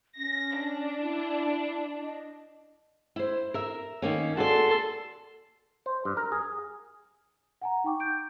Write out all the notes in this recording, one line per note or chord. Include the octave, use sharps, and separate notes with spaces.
C#4 A#6
D4
E4
D#5
E4 C5
A#4 E5
D#3 A#3 C#4
F#4 G#4 A4 D5 C6
C5
G2
A#4
G#4
F#5 G#5 A#5
D#4 G5 C#6 D6
G6 D7